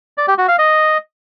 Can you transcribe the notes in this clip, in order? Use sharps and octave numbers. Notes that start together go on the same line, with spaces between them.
D5
G4
F#4
F5
D#5